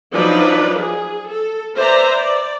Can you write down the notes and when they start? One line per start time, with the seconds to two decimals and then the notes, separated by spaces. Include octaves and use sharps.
0.14 F3 F#3 D4 D#4 B4 D5
0.78 G#4
1.29 A4
1.76 B4 C5 D5 E5 A#5
2.12 D5